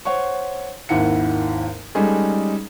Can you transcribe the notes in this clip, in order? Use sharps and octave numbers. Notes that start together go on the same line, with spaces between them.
C5 C#5 F#5 C#6
G#1 D#2 D#3 E4 F#5 C#7
G3 G#3 C#4 D#4 G#4 A4